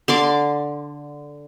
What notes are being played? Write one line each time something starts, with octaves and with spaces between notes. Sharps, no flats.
D3 C6 D6